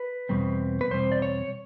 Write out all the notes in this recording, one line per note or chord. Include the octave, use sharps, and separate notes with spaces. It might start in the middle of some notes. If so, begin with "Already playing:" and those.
Already playing: B4
E2 B2 G3 C4
B4
E2 B2 G3 C4 C5
D5
C#5